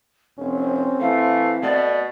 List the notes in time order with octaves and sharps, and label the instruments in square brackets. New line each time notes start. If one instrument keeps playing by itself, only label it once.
[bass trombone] F1 [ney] C4 [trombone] C#4
[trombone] E3 [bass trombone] A3 [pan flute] F5
[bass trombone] B2 [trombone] A3 [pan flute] D5